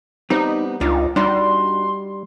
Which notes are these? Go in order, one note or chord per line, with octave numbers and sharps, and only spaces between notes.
G3 B3 C4 D#4
C#2 D4 D#4 F4
G3 D4 D#4 F#4 C6